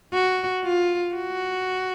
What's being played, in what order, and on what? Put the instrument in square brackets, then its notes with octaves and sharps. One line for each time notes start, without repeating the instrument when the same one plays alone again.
[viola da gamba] F#4
F4
F#4